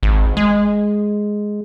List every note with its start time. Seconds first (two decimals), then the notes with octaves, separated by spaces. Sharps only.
0.03 G#1
0.37 G#3